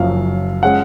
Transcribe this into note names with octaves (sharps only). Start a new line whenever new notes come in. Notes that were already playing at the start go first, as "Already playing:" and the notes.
Already playing: F#1 F#2 F3 F5
G#3 C#4 F#5